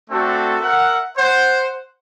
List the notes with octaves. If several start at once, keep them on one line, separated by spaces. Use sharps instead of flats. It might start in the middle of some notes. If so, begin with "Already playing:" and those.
A3 C4 D4 F#4 A4
A#4 E5 F#5
C5 F#5